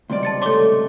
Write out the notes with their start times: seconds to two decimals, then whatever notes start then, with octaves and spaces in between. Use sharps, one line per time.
0.10 C#2 C3 D#3 G3 D5 C6
0.23 A5 A6 C#7
0.42 A2 A4 C#5 C6 D6 G7